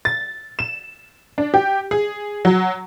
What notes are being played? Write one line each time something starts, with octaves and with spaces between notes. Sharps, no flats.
A6
E7
D4
G4
G#4
F#3